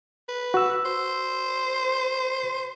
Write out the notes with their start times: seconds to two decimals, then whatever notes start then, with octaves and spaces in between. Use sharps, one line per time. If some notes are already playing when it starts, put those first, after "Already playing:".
0.28 B4
0.54 F#4 E6
0.85 C5